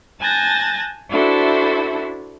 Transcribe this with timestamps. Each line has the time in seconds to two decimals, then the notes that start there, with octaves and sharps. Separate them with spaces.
0.19 G#5 A5 F#6 G6 A6 A#6
1.09 D4 E4 F#4 A4 C5 E5